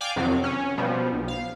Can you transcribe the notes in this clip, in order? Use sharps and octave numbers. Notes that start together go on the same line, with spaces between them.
D5 F5 G5 G#5 D6
F2 C3 D#3 F#3
C#4
B2 F3 G3
B1
F5